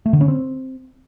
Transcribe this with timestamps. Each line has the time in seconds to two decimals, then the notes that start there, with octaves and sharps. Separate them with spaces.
0.06 A3
0.13 D3
0.21 C#4
0.28 C4